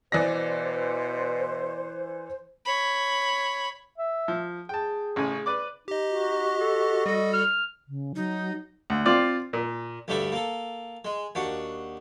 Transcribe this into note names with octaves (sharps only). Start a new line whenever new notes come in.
B2 E3 C5 D5 A#6
C#5 B5
E5
F3
G#4 G5 A5
A1 C#3 G#5
B4 D5 D6
D#4 G4 D#5
F#4
A4
G3 A4 D#5
F6
C#3
F#3 D#4
D2
C4 F4 D5
A#2
D2 G2 G3 A4 D5 E5
A#3 A4
G#3
D#2 D4 F#4